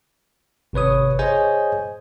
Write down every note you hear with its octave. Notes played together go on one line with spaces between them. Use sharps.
G#1 C3 B4 C#5 D#6
G#4 C5 C#5 D#5 G#5 G6